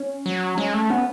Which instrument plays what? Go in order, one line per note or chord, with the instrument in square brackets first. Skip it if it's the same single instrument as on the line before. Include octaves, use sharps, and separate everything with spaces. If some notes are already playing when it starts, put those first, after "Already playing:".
Already playing: [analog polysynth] C#4
[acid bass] F#3
[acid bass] G#3 [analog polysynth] C#4
[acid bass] A3
[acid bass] B3 [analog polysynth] C#4